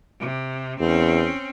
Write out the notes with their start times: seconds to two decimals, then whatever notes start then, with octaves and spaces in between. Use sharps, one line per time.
0.20 C3
0.80 E2 C4 C#4